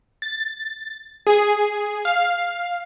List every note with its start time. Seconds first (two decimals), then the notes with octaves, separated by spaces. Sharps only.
0.22 A6
1.27 G#4
2.05 F5